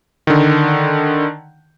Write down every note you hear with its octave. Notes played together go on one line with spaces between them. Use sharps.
D3 D#3